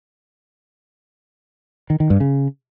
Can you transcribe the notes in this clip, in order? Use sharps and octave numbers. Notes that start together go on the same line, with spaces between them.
D#3
D#3
G2
C#3